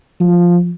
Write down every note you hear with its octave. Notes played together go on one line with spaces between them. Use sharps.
F3